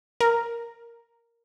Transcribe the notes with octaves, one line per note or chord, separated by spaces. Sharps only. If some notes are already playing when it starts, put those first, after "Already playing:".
A#4